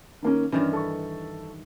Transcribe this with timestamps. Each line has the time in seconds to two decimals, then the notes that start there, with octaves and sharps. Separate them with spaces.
0.22 D#3 A#3 C#4
0.52 G2 D#3 E3 C#4
0.73 A4 C#6